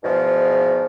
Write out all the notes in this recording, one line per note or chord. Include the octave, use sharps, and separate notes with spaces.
E2 G#2 B2 F3